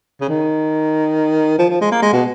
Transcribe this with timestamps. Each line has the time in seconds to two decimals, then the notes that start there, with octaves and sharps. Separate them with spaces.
0.21 C#3
0.29 D#3
1.59 F3
1.70 F3
1.81 G#3
1.91 A#3
2.02 G#3
2.13 B2